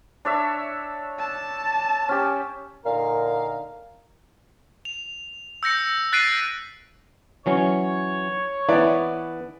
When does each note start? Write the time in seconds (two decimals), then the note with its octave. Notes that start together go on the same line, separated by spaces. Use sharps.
0.25 D4 C#5 E5
1.19 A5
2.09 C#4 G4
2.85 A#2 D3 D#4 A#4 F5
4.85 F7
5.63 E6 G6 A#6 C#7
6.13 F#6 A6 B6 C7 D7 D#7
7.46 E3 F#3 C#4 C#5
8.69 E3 B3 E4 B4 D5